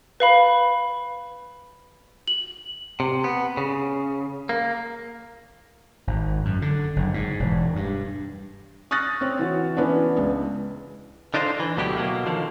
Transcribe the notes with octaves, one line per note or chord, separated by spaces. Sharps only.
B4 F5 B5
F#7
C3
B3
C#3
A#3
G#1
F#2
D3
F#1
G#2
E1
G2
C#6 D#6 F6 F#6 A6 A#6
C4 C#5
E3 F#4
E3 B3 C#4 D4
C#2
D3 D4 D#4 F4 C5
E3
D2 B2 F#3 E4 G4
B2 F#3 A#3
D3 D#3 F3